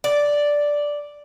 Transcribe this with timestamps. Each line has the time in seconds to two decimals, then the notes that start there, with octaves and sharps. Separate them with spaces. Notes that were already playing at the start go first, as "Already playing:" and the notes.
0.04 D5